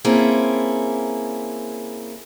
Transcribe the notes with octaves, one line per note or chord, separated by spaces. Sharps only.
A#3 C4 C#4 E4 G#4 A4